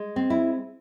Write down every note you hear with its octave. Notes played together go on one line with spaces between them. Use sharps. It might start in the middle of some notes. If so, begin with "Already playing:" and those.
Already playing: G#3
C4
E4